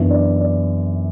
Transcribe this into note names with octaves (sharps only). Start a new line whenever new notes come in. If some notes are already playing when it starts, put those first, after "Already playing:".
Already playing: F#2 E3 B3 D4 E5
D5
D5